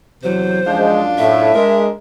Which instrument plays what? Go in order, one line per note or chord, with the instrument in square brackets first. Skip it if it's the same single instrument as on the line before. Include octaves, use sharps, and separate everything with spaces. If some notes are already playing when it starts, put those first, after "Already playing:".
[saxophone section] E2 C3 F#3 [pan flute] C5
[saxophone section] F#2 D4 F4 [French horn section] F3 G#3
[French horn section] A2 [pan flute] E5
[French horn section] G#3 [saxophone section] D4 A#4